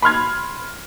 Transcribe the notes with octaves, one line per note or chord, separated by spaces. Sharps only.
B5 C6 F6 G#6